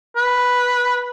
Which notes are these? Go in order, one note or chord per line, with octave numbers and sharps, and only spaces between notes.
B4